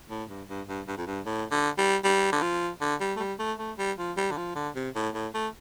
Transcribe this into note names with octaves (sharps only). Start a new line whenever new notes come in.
A2
G2
G2
G2
G2
F2
G2
A2
D3
G3
G3
D3
F3
D3
G3
A3
G3
A3
A3
G3
F3
G3
D3
F3
D3
C3
A2
A2
A3